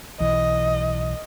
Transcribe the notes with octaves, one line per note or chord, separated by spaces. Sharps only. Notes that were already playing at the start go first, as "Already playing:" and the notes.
B1 E3 D#5